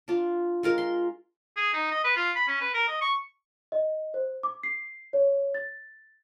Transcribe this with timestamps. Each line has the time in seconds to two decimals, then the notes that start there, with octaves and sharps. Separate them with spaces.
0.08 D4 F4
0.63 G#3 F4 A#4
0.78 C6
1.56 G#4
1.73 D#4
1.91 D#5
2.04 B4
2.16 F4
2.35 B5
2.48 C#4
2.61 B4
2.74 A#4
2.88 D#5
3.01 C#6
3.72 D#5
4.14 C5
4.43 D6
4.63 C7
5.13 C#5
5.54 A6